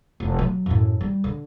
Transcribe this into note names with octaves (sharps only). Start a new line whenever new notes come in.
F1
F#3
F#2 A2
G3
D3